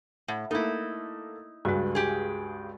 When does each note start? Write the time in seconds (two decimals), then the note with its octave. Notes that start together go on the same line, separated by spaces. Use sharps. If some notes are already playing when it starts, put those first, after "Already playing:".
0.28 A2 F#5
0.51 A3 A#3 D#4 E4
1.65 C#2 G2 G#3 F#4
1.95 G4 G#4